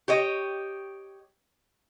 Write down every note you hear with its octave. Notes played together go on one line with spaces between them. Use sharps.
G4 C#5 D#5